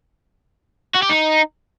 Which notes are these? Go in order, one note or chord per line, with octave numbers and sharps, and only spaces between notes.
F#4
G4
D#4